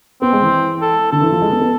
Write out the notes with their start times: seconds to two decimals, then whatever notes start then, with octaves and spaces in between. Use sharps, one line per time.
0.22 B3 C4
0.33 G#3
0.42 E3
0.82 A4
1.12 D3 A4
1.21 E3
1.32 F3
1.42 G#3
1.51 B3
1.61 B3